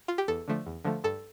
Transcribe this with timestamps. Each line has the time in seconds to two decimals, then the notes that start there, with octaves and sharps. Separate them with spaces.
0.08 F4
0.18 G4
0.28 E2 A4
0.48 D3 F3 A3
0.66 E2
0.85 D3 F3 A3
1.04 G2 A4